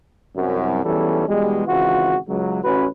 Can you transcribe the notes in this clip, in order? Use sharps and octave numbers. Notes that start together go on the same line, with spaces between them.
C2 F#2
B1 E2 E3 G3 C#4 A4
B2 E3 G3 G#3
G#1 C#3 E3 F4 F#4
C#2 F#3
A1 C#4 F#4 B4